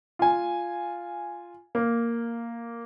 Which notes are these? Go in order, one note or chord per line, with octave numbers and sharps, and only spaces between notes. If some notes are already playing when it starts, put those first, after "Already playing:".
F4 G#5
A#3